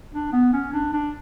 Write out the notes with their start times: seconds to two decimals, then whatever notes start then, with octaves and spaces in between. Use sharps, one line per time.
0.14 D4
0.33 B3
0.53 C#4
0.73 D4
0.93 D4